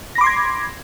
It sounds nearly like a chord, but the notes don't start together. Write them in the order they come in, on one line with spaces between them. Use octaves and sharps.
A#6 B5 D6 C6 G#6